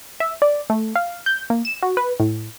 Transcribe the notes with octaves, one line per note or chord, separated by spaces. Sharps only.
E5
D5
A3
F5
G6
A#3
E7
F#4
B4
A2